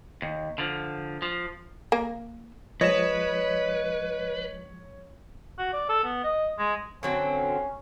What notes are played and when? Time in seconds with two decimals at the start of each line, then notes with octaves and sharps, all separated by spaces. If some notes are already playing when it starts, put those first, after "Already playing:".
0.22 D#2
0.58 D3 F3
1.22 F3
1.92 A#3
2.81 F3 G#3 B4 C#5 D#5 D#6 E7
5.59 F#4
5.73 D5
5.89 A4
6.04 B3
6.24 D#5
6.58 G#3
7.03 D3 F#3 C4 C#4